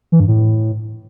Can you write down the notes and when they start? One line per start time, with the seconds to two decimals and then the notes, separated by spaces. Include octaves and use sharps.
0.12 E3
0.20 G2
0.28 A2